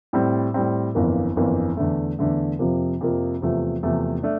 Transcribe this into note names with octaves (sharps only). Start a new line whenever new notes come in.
A2 G3 C4
A2 G3 C4
G1 F2 E3 A#3
G1 F2 E3 A#3
E2 D3 A3
E2 D3 A3
F2 C3 F3 A#3
F2 C3 F3 A#3
E2 C3 F3 A3
E2 C3 F3 A3
A3 D4